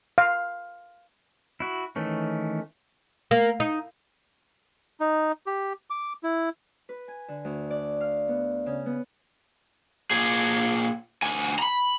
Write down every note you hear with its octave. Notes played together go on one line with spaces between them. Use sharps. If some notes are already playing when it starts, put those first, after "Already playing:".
F5
E4 F#4
D#3 E3 A3 C#4
A#3
D#4
D#4
G4
D6
E4
B4
G#5
D3
D2
D5
F5
B3
C#3
B3
A#2 G#4
D2 G#5
A#5 B5